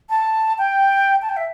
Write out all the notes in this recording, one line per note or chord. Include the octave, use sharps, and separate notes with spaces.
A5
G5
A5
G5
E5